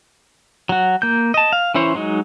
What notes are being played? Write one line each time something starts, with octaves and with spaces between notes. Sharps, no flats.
F#3 F#4
A#3 G6
D#5 A5
F5
E3 C#4 E4 C5 C#5
F#3 G#3 D#4